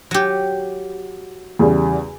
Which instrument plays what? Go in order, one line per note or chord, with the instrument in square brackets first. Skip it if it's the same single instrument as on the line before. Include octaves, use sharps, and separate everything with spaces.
[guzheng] F#3 G4
[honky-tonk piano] E2 C#3 G3